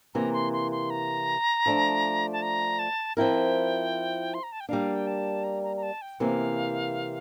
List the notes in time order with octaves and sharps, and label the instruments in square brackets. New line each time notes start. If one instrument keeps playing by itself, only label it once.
[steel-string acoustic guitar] C3 E3 A#3 [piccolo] A#5
[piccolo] C6
C6
C6
A#5
[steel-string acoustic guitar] F3 A3 D4
[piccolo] A5
A#5
A5
[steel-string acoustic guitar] F3 C4 E4 A#4 [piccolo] G5
[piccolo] C6
A#5
A5
G5
[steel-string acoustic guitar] G3 A#3 D4 [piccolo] F5
[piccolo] G5
A5
A#5
A#5
A#5
A5
G5
[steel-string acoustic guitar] C3 E3 A#3 [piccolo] F5